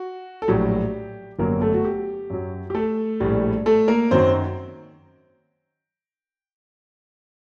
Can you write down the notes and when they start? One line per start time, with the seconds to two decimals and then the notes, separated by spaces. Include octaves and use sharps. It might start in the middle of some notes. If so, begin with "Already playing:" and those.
Already playing: F#4
0.42 A4
0.48 A#1 A2 F#3 G4
1.39 G1 F#2 F#3 A#3 A#4
1.61 A3 A4
1.74 F#4
1.85 G4
2.30 F#2 F#3
2.70 G4
2.75 A3 A4
3.20 A#1 A2 G3
3.66 A3 A4
3.88 A#3 A#4
4.11 F#2 D#3 F#3 C4 C5